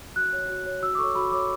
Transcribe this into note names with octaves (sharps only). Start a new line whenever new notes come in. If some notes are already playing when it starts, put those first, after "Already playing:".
F#4 F#6
C#5
F#4
C#5
F#4 E6
D6
A4 C#5 C#6
F#4 B5
A4 C#5 D6